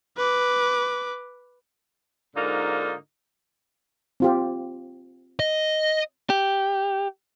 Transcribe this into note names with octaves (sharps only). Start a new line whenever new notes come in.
B4 D6
G#2 D3 A#3 D#4 F4
C4 F4 G4
D#5
G4